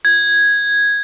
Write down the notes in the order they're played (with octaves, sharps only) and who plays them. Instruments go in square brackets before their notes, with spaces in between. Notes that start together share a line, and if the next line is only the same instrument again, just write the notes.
[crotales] G#6